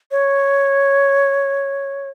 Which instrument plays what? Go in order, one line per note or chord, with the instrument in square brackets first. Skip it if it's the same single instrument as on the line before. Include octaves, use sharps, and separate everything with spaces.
[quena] C#5